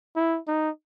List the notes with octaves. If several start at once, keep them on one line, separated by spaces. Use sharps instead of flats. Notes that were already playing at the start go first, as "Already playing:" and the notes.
E4
D#4